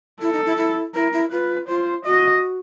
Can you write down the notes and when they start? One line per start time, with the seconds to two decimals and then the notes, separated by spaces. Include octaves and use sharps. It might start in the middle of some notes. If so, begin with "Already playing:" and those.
0.21 E4 A4
0.33 D#4
0.46 E4
0.57 E4
0.95 E4 A#4
1.12 E4
1.31 F4 B4
1.68 F4 C5
2.05 F#4 D#5